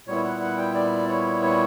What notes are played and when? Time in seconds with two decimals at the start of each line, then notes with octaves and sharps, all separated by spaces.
0.07 A#2 G3 B3 E4 C#5
0.24 F#5
0.41 F#5
0.58 G5
0.75 D5
1.09 C#5
1.42 C#5